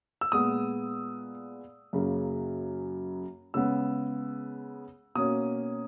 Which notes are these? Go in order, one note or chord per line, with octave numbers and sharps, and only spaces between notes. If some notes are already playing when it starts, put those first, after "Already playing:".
E6
A#2 G#3 B3 D#6
F#2 C#3 F#3 A#3
C#3 G#3 B3 E6
B2 A#3 C#4 D#6